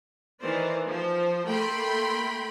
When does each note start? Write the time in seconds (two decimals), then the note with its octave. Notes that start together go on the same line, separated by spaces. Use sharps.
0.41 D#3 E3 C5 D5
0.88 F3 C5
1.45 A3 A#3 G5 B5 C6